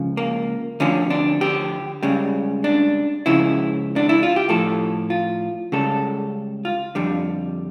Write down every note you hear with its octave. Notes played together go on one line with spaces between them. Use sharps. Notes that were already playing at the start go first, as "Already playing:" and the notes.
Already playing: C#2 C#3 F3
A#3
D2 D3 F3 C#4
D4
G4
C#2 C#3 G3
D4
C#2 C#3 F3 E4
D4
E4
F4
G4
A2 F3 A4
F4
C#2 C#3 G3 A4
F4
F2 D3 G3